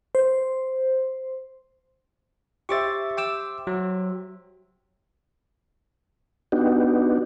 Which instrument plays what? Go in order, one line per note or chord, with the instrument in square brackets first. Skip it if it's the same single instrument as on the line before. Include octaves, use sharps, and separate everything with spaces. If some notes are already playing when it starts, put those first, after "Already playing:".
[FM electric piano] C5
[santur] G4 C5 E5 [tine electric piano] C#6 D6 A6
[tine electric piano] G5 D6 E6
F#3
[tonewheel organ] B3 D4 D#4 F#4 G4